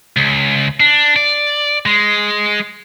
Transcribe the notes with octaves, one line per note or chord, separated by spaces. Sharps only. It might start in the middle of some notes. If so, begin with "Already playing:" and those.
C#2
D4
D5
G#3